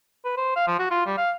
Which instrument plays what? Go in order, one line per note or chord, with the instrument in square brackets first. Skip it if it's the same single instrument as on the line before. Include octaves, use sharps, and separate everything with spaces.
[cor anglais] B4
C5
F5
F3
F#4
F4
G3
F5